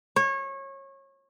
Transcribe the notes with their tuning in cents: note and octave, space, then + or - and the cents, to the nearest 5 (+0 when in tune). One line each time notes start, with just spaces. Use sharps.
C#5 -25